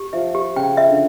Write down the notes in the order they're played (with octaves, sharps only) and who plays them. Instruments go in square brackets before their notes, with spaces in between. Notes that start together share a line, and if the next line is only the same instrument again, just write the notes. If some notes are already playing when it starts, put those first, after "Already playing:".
Already playing: [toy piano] G4
[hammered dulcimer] F3 [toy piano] E5
[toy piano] G4
[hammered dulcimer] C#3 [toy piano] G5
[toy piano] E5
[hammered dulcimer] D3